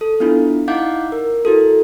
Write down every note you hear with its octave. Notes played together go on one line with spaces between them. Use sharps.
A4
B3 D4 E4 F4
D#4 E4 F5 F#5 D6 G6
A#4
E4 F#4 A4